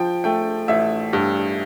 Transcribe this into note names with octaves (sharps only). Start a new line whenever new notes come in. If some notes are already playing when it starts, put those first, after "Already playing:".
Already playing: F3 G5
A3 G5
A1 E5
G2